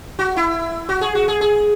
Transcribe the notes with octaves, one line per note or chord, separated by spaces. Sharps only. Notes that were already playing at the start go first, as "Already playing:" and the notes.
F#4
E4
F#4
G#4
F#4
G#4
G#4